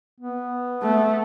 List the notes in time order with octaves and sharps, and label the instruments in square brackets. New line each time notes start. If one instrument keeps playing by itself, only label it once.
[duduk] B3
[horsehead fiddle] A3